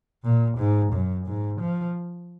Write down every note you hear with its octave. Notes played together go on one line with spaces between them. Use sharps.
A#2
G#2
F#2
G#2
F3